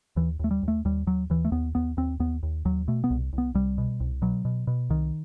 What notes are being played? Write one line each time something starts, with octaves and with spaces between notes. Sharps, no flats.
D#2 E3
D#2 A3
G3
D#2
A3
D#2 G3
D#2 F#3
D#2 E3
A3
D#2 B3
D#2 B3
D#2 C4
D#2 B3
D#2
D#2 F#3
B2 A3
B3
C2
C2
B3
C2 G3
B2
C2
B2 F#3
B2
B2
C2 D#3